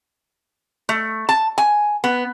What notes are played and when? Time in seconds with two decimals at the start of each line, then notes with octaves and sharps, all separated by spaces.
0.89 A3
1.29 A5
1.58 G#5
2.04 B3